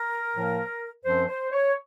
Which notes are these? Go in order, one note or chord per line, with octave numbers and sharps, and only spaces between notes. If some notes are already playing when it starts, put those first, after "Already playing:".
Already playing: A#4
A2 F3 A#3
F#2 F3 C4 C5
C5
C#5